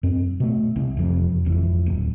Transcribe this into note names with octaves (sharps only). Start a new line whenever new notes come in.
F#2 C4
B2 A3
C2
E1 F2 C3
G#1 F2 E3
D1